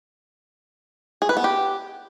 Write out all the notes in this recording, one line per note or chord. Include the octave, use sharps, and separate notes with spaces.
G#4
B4
B3
G4